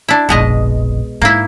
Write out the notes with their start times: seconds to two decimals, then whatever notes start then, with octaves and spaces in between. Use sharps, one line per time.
0.08 D4 E4
0.29 F1 A#1 B2 G#3 D#5
1.22 G#2 A#3 E4